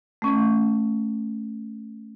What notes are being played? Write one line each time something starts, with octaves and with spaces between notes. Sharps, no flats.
A3 C#4